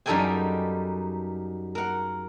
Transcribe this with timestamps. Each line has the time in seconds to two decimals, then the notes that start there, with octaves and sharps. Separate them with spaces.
0.06 F#2 G3 D#4 A4 G5 G#5
1.75 A#4 F#5